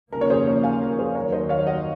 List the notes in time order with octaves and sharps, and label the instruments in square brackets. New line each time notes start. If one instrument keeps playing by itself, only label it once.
[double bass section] D#2 C#3 F3 A#3 C#4 [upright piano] A#4
[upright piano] C#5
G#4 C5
A#4 C#5
F5 G#5
A#4
G#4 C5
[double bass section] D#2 D#3 F#3 [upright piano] A#4 C#5
[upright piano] C5 D#5
C#5 F5
D#5 F#5